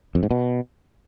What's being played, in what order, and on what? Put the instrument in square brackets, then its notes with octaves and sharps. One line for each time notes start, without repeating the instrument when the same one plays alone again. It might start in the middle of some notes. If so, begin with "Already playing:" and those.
[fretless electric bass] F2
G#2
B2